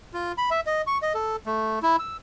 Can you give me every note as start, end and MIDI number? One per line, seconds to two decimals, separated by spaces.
0.14 0.32 65
0.38 0.50 83
0.51 0.60 76
0.66 0.82 75
0.87 0.98 85
1.02 1.13 75
1.14 1.36 69
1.46 1.79 57
1.83 1.96 64
1.99 2.17 88